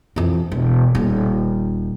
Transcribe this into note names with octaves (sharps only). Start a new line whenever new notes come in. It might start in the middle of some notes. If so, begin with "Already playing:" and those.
F2 E3
E1
D#1